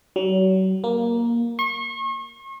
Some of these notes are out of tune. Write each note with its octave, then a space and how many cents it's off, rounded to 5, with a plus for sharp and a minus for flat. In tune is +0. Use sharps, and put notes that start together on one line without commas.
F#3 +35
A#3 +10
C#6 -40